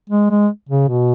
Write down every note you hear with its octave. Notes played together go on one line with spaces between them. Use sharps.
G#3
G#3
C#3
B2